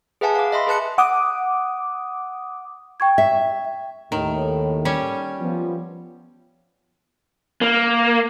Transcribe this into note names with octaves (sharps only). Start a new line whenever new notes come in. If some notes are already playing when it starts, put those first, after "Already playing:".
G#4 B4 E5 F#5 G#5 A5
F5 D6
D#5 E5 B5 C6
G#4 B4 A5 F#6 C#7
F#5 D6 D#6
G5 C#6 G#6
E5
D#2 A2 D#3
G3 C#4
F3 B3
A#3